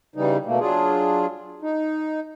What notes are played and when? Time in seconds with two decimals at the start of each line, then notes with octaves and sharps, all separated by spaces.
0.16 C#3 E3 G3 D#4
0.46 B2 A3 A#3
0.60 F#3 D4 F4 G#4
1.62 D#4